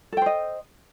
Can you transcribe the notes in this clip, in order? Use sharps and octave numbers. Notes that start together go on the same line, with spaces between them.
A4 C5 D#5 G5